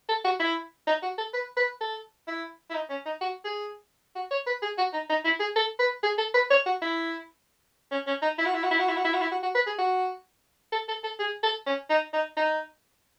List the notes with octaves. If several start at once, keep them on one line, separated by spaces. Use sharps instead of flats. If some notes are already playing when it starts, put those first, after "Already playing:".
A4
F#4
E4
D#4
F#4
A4
B4
B4
A4
E4
E4
D#4
C#4
D#4
F#4
G#4
F#4
C#5
B4
G#4
F#4
D#4
D#4
E4
G#4
A4
B4
G#4
A4
B4
C#5
F#4
E4
C#4
C#4
D#4
E4
F#4
E4
F#4
E4
F#4
E4
F#4
E4
F#4
E4
F#4
F#4
B4
G#4
F#4
A4
A4
A4
G#4
A4
C#4
D#4
D#4
D#4